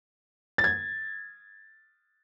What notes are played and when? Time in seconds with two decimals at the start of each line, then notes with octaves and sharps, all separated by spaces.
0.58 A6
0.64 G#6